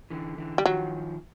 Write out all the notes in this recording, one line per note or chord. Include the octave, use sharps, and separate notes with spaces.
D3 E3
D3 E3
G3
D#3 F3 F#3